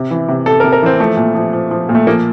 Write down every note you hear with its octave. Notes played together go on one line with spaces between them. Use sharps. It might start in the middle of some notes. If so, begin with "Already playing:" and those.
Already playing: C3
E3
C3
C3 A4
A#4
C3
A#4
E3 C4
F3 A3
A#2
F3
F3
F3
A#2
A3
F3 A#3